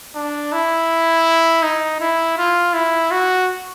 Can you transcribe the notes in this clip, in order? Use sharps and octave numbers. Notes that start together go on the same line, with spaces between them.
D4
E4
D#4
E4
F4
E4
F#4